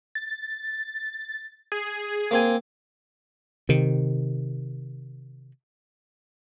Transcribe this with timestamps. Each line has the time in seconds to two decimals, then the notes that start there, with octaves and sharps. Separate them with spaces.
0.15 A6
1.72 G#4
2.31 A#3 C4 G#5
3.69 C3 D#3